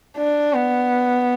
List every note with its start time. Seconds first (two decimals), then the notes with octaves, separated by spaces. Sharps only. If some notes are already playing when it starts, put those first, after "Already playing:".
0.17 D4
0.54 B3